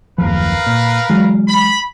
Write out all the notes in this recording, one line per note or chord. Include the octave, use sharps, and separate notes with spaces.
F#1 D#2 F3 A#4 B4 F5
A#2
E3 F#3 G#3
B5